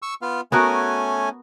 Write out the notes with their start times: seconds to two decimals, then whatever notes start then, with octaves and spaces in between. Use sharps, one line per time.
0.02 C#6 E6
0.22 B3 F4 F5
0.52 A3 B3 C#4 F#4 A#4 G#5